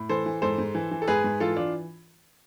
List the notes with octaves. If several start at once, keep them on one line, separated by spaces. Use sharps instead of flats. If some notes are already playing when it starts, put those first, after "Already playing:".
Already playing: A2
E3 A4 C5
E3
G#2 A4 C5
G#2
E3
E3
A4
G#2 G#4 B4
G#2
E3 F4 A4
E3 D4 F4